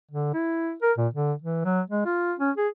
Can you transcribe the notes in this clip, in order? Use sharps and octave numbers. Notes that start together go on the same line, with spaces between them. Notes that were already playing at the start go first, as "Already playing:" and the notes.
D3
E4
A#4
A#2
D3
E3
F#3
G#3
F4
C#4
G#4